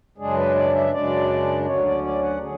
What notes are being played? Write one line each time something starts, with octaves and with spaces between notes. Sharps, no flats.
F#2 C#3 G#3 D4 G#4
B4
D5
E5
F#2 C#3 G#3 D4 D5
D2 D3 F#3 C#4 C#5
D5
D5
F#5
D3 F#3 G#4